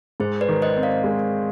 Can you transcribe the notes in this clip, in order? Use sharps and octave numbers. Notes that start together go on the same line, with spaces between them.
G#2 G#4 C5
B4 D5
D#3
C5 D#5
C4
D5 F5
G#3